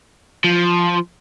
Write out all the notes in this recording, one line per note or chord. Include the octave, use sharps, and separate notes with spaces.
F3